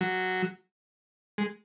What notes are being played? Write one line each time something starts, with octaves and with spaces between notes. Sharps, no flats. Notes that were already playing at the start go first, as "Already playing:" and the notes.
F#3
G#3